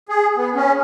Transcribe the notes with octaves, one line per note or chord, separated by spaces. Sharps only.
G#4
B3
C#4